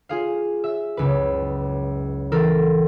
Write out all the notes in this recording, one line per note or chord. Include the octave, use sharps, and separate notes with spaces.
F4 G#4 F5
E5 E6
F#1 C#2 B4
E3 A4 A#4